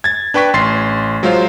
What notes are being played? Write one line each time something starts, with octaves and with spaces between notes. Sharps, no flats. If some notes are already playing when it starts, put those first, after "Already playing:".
G#6 A6
D4 B4 G5 C#6 B6
A1 C6 A6 C7
F#3 G#3 F4 C5 F5